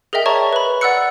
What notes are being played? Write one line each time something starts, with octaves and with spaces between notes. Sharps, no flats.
G#4 A#4 D#5 E5 G5
C#5 D5 E5 A5 A#5 C#6
B4 B5
D5 F#5 B5 E6 F#6 C#7